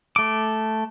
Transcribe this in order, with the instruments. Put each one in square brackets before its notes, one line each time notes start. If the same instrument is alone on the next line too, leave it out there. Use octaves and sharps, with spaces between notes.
[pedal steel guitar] A3 D6